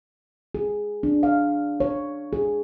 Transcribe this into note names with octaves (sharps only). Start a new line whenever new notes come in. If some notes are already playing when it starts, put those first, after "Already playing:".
G#4
D4
F5
C#5
G#4